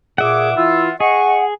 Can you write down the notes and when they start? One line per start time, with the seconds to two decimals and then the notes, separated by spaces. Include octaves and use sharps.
0.18 A#2 G#4 E5 F#5 D6
0.56 E3 E4 F4 E6
1.00 G#4 D#5 F#5 C#6